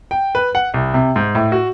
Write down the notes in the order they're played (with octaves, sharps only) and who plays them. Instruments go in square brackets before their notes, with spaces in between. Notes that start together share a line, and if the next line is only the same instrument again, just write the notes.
[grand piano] G5
B4
F#5
C2
C3
G#2
A2
F#4